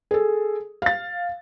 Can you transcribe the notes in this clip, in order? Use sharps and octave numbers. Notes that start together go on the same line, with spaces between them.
G#4 A4
F5 A6